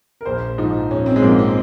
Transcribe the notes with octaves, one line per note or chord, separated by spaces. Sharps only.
A#4
A#1 C5
G#2 F3 D#4
A#1 C#4
C4
G#3
G#2 F3 A#3
C4